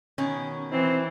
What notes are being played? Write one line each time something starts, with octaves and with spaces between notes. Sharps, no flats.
B2 D#3 C#4
E3 C4